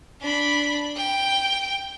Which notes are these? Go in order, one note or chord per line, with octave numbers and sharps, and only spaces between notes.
D4 B5
G5